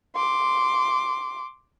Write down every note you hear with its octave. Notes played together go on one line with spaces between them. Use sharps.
C6 D6